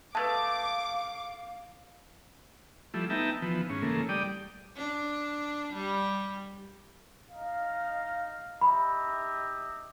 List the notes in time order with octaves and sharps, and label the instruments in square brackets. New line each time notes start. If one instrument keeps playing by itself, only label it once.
[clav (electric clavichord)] G#3 A3 [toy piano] B4 A5 [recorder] F5 [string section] D6
[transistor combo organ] F3 G3 A3 E4
B3 D#4 E5 G5 A5 A#5
E3 F3 B3
G#2 C#4
C#3 E3 A3 A#3
G3 D5 G5 D#6
[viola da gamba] D4
G3
[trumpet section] D#4 F5
[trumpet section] D#4 G4 E5 [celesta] B5